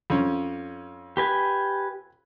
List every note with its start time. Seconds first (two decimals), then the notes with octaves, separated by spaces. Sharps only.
0.10 F2 C#4
1.17 G4 B4 G#5